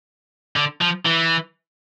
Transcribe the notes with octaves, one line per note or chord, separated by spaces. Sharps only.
D3
F3
E3